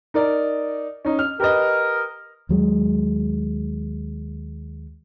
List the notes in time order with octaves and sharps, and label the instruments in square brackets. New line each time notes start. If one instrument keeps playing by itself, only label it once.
[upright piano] D#4 A#4 D5
C#4 D#4
F6
[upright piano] G4 B4 D#5 [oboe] A#4
[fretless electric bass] D#2 F#3 G#3